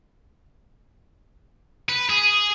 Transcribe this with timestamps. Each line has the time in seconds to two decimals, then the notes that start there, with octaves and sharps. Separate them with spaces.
1.89 B4
2.10 G#4